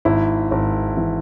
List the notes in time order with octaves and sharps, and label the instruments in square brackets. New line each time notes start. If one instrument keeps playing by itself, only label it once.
[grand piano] G#1 E4
G#1
E3